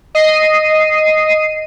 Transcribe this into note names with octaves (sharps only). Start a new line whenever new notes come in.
D#5 C7 D#7